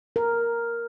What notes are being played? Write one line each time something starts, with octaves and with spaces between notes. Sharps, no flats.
A#4